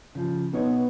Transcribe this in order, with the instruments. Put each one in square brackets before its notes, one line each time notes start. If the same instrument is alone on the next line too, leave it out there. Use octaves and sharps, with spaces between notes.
[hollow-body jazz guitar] C#3 F3
[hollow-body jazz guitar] B1 D#4 C#5 [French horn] B3